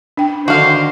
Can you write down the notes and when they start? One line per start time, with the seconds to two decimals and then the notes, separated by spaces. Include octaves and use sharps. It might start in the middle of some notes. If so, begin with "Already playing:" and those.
0.17 D4 G5
0.48 D3 D#3 F#4 C5 F5